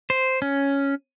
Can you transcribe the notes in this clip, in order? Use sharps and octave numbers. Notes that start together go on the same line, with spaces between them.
C5
C#4